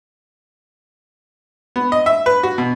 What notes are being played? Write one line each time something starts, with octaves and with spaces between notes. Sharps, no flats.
B3
D#5
E5
B4
F#4
B2